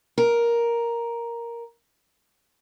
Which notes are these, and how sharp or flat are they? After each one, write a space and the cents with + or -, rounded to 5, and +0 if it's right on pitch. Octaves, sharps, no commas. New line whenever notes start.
A#4 +5